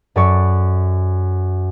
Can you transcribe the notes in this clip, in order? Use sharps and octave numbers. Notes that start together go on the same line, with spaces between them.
F#2 A4 D5 C#6 A6